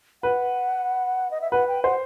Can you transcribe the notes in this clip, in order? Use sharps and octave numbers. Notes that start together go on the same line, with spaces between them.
B4 F#5
D#5
E5
B4 F#5
G5
C5 F#5